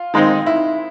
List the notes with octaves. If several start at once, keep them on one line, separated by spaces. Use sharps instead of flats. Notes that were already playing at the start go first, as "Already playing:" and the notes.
Already playing: F4
D#3 G#3 C4 D#4
E4